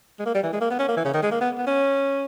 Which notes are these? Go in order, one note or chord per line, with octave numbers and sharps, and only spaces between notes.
G#3
A#3
G3
E3
G#3
A#3
B3
C#4
A#3
E3
C#3
D#3
G#3
A#3
B3
B3
C#4